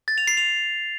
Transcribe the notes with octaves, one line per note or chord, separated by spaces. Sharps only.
A6
F7
C7
F7